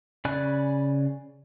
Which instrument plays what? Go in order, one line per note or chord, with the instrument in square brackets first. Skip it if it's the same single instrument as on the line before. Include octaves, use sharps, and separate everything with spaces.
[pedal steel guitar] C#3 D5 G#5 B5 F#6